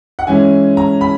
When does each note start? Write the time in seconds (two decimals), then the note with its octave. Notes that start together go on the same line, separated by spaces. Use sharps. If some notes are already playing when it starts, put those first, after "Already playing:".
0.19 F#5
0.27 E3 G#3 C#4 E4 G#5
0.77 A#5
1.01 B5